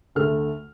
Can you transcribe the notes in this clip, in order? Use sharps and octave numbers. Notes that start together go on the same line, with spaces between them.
D2 D3 A3 F6